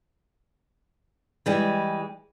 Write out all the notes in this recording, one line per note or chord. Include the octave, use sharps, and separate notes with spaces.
E3 G3 G#3